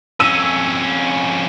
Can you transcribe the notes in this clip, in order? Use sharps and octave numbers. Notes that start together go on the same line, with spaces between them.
F2 C#4 E6 D#7